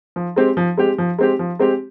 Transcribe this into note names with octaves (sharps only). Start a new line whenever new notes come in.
F3
G#3 C4 G4
F3
G#3 C4 G4
F3
G#3 C4 G4
F3
G#3 C4 G4